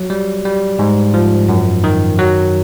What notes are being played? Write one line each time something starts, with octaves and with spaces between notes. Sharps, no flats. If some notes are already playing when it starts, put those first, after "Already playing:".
Already playing: F#3
G3
G3
G#2
F3
F#2
D#3
F#3